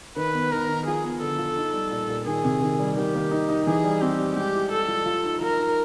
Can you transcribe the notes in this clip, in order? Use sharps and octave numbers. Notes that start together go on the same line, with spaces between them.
D#3 B4
B3
D#3 A#4
D#3
F3 G#4
B3
D3 A4
F3
D#4
G3
A#2
A#2
D#3 G#4
C3
D#3
G3
D#3 G4
A#3
D#4
D#4
E3 G#4
G3
C4 G4
G3
G#3 G4
E4
E4 A4
F3
F3
D#4
F3 A#4
D#4